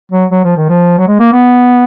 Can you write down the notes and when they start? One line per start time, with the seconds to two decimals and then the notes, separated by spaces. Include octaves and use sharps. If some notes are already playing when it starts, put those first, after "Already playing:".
0.12 F#3
0.31 F#3
0.44 F3
0.57 D#3
0.69 F3
0.98 F#3
1.07 G#3
1.19 A#3
1.32 B3